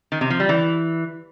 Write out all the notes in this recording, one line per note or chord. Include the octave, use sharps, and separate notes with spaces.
D#3
C3
F3
G3
E3